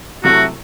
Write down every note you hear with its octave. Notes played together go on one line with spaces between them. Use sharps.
C3 F#3 A3 E4 F#4 A4